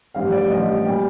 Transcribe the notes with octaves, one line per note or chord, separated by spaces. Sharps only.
A1 G2 F3 F5
D5
A1 G2 F3 D#5
A#2 G3 G5